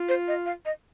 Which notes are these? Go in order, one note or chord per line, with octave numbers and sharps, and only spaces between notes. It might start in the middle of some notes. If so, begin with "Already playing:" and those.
Already playing: F4
C5
D#5
F5
D#5